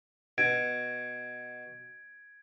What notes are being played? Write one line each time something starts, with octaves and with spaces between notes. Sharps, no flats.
B2 G#6 D7